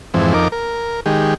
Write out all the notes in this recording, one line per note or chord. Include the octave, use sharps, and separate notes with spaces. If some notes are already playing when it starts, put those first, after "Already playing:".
F2 G#2 E3 C4
F2 D#4 A#4 D6
A#4
D#3 G#3 G4